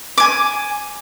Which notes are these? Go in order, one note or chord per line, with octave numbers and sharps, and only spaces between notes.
G#5 D6